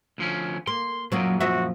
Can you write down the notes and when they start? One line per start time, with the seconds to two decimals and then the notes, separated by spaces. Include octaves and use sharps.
0.18 D2 F3 C#4
0.67 A#3 C6
1.12 F#2 A#2 F#3 A#3 D#4
1.40 F3 F#4 D#5 E5